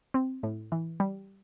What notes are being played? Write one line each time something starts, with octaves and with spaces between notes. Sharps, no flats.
C4
A2
E3
G3